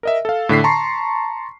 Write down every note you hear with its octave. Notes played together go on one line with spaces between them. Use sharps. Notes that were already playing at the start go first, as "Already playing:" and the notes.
A#4 D#5 E5
A4 F5
A2 D3 B6 C7
A5 A#5 C6 C#6